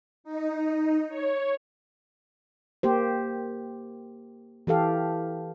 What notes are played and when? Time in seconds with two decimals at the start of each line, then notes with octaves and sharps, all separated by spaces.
0.24 D#4
1.08 C#5
2.83 A#3 G4 C5
4.67 E3 G4 A4 F5